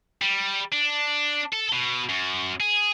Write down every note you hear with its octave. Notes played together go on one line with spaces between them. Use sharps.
G3
D4
A4
B2
F#2
G#4